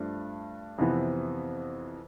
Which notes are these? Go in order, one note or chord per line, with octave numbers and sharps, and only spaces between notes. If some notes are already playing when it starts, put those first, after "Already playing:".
Already playing: G2 F3 A3 D4
F2 C3 E3 B3